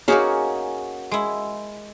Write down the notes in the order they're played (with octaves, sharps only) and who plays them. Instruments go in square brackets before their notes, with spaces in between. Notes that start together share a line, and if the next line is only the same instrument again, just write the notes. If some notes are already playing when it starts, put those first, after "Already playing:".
[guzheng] A#3 D#4 F5 [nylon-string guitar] C#4 F#4 G#4
[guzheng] G#3 E4